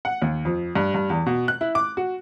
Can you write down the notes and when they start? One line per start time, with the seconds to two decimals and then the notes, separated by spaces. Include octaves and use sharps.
0.05 F#5
0.22 D#2
0.45 F2
0.76 G2
0.94 G2
1.10 E2
1.26 B2
1.48 F#6
1.61 E4
1.75 D6
1.97 F#4